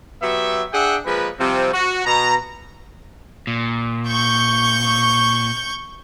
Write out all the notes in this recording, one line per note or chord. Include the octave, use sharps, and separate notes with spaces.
F#3 B3 G4 E5
D4 G#4 E5 F#5 G5
F3 G#3 A#3 B4
C3 F3 G3 C4
F#4
B2 A#5
A#2
C#6 G6